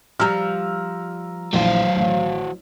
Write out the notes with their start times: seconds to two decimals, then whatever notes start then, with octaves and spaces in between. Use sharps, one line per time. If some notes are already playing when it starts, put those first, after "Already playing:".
0.20 F3 G3 A#5 E6 F6
1.53 A#1 E3 F#3 C5 F5
1.96 A1